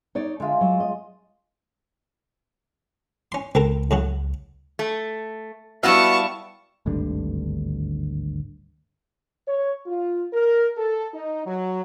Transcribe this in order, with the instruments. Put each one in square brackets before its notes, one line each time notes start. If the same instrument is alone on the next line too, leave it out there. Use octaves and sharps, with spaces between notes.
[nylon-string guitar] D#4 C#5 D5
[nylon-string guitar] D3 D4 E5 [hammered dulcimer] G#3 F4
[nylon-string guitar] F#3
D#5
[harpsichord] C#4 C6
[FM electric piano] C#2 [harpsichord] C4 A4 A#4
[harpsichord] A2 C#3 F#3
[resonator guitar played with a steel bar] A3
[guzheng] G3 E4 F5 [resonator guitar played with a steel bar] B3 F#4 E5 [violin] A5 C#6
[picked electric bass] G#1 D2 G2 D3
[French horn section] C#5
F4
A#4
A4
D#4
F#3